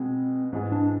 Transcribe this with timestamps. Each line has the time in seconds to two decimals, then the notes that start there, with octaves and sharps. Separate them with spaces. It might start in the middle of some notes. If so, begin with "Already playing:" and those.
Already playing: B2 G#3 C4
0.53 G#2 E3 G#3
0.72 D4